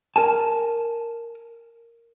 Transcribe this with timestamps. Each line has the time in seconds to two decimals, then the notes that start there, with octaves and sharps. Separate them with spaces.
0.16 A#4 G#5 A5